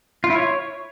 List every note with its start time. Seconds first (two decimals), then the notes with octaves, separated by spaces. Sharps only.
0.24 F4
0.30 E4
0.36 C#5